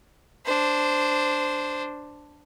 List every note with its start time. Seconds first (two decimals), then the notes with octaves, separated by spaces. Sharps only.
0.45 D4 C5